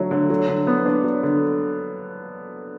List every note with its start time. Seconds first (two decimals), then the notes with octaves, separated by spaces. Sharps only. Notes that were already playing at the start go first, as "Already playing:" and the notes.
Already playing: D3 F#3 A3
0.11 D3
0.30 F#3
0.48 D3
0.67 B3
0.86 D4
1.04 F#3
1.23 D3